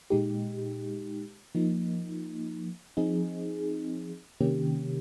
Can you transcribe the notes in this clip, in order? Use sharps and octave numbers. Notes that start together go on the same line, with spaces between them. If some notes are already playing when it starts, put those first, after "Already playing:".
A#2 G#3 D#4 G4
F3 A#3 D#4
F3 C4 D#4 G#4
C3 D#3 A#3 C#4 G4